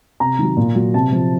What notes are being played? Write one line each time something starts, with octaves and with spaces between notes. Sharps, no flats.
C3 A#5
D#3 F#3
A#2
F#3
C3 A5
F3